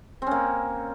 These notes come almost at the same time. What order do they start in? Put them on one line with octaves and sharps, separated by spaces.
C4 C#4 A#3